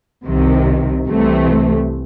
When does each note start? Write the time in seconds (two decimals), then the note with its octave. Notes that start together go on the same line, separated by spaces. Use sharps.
0.25 C2 C3 D#3
1.07 C2 C3 E3 A3